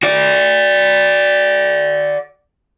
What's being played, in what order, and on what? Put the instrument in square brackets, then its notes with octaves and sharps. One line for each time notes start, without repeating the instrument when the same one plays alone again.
[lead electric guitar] F#4 D5